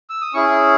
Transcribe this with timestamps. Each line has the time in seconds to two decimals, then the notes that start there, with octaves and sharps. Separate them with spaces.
0.10 E6
0.21 D#6
0.34 C#4 E4 G#4 C#6